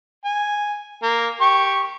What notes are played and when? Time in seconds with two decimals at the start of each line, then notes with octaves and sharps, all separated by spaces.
0.25 G#5
1.03 A#3
1.41 G4 C#6